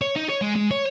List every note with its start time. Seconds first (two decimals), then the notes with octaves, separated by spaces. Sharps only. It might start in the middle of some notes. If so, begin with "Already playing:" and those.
0.02 C#5
0.16 D#4
0.29 C#5
0.42 G#3
0.56 G#3
0.71 C#5